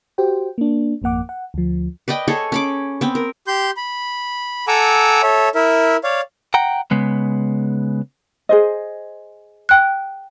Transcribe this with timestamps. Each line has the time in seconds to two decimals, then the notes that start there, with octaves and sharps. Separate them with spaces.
0.18 F#4 G4 C5 G5
0.58 A#3 D4
1.02 G#1 F2 A#3 F#5 D6
1.29 F#5
1.54 D2 F3
2.08 B4 D5 D#5 G5
2.28 G#4 A4 C#5
2.52 C#4 B5 D6
3.01 B3 C4
3.15 A#4
3.47 G4 C6 G6
3.77 B5
4.68 A4 F#5 G#5 A#5 D6 E6
5.22 A4 C#5 E5
5.55 E4 A#4 E5
6.04 C#5 D5 F5
6.54 F#5 G5 A#5
6.91 C#3 G#3 B3
8.49 G#4 C5 D#5
9.69 G5 F#6